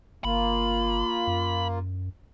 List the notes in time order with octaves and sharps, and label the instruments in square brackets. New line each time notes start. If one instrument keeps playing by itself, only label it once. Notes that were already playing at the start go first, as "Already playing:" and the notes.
[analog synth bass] G1 [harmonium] A#3 F4 [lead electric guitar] B5
[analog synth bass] F#2